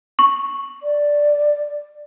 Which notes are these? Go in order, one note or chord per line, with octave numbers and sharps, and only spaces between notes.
C#6
D5